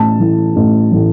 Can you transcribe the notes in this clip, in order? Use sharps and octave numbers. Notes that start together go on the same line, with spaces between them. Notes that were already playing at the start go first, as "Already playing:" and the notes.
Already playing: A1 A5
A2 E3
A1
A2 E3